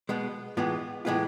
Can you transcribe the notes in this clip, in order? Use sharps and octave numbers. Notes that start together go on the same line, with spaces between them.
B2 G#3 B3
A2 E3 G#3 B3 F4
A2 E3 G#3 B3 F4